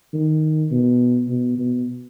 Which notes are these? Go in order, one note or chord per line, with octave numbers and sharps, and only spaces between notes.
D#3
B2
B2
B2